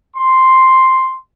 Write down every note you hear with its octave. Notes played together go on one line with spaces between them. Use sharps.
C6